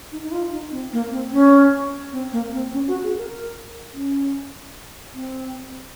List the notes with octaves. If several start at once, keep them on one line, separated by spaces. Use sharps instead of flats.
D#4
D#4
F4
D#4
C4
A#3
C4
C#4
C4
A#3
C4
C#4
F#4
G#4
A#4
C#4
C4